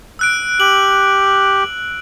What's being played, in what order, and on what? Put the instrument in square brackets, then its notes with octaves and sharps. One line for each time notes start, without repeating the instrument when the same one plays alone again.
[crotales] E6 F#6 D7
[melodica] G4 [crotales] F#7